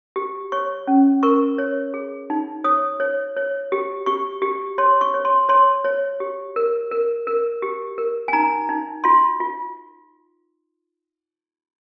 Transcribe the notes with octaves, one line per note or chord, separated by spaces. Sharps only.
G4
C#5 C#6
C#4
A#4 C#6
C#5
G#4
D#4
C#5 D#6
C#5
C#5
G4
G4 C#6
G4
C#5 C6
C#6
C#5
C6
C#5 C6
C#5
G4
A#4
A#4
A#4
G4
A#4
G#5
D#4 A#5
D#4
F4 C6
F4